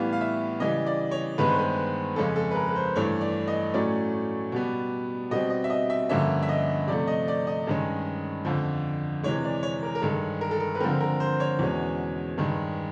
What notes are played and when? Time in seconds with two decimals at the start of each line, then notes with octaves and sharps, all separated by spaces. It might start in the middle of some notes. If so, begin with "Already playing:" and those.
Already playing: A2 E3 G3 B3 F5
0.13 F5
0.21 E5
0.60 C#3 E3 G3 D#5
0.86 D5
1.11 C#5
1.38 G2 D#3 G#3 B3 B4
1.48 C5
1.58 B4
2.16 F2 C#3 F3 G#3 C#4 A4
2.36 A4
2.51 B4
2.56 A#4
2.68 B4
2.75 C5
2.96 G2 E3 A3 C#5
3.21 D5
3.48 D#5
3.74 A2 F#3 A3 C#4 D5
4.52 B2 G3 B3
5.31 B2 G3 C4 D#5
5.50 D#5
5.64 E5
5.70 D#5
5.90 E5
6.09 G2 D3 F3 A#3 C#4 E5
6.43 E5
6.49 D#5
6.88 C3 F3 A3 D5
7.07 D#5
7.28 D5
7.47 D#5
7.67 G2 D#3 G#3 C#4
8.45 F2 D3 F3
9.23 C3 E3 G#3 C#5
9.44 D5
9.63 C#5
9.83 A#4
9.95 A#4
10.02 G2 D#3 G#3 A4
10.41 A#4
10.51 A4
10.60 A#4
10.75 B4
10.80 D3 F3 G#3 C4 A#4
11.00 A#4
11.20 C5
11.40 C#5
11.59 E2 B2 G#3 C#4
12.38 G2 D#3 G#3